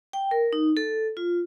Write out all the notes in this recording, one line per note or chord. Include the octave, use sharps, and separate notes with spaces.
G5
A#4
D#4
A4
F4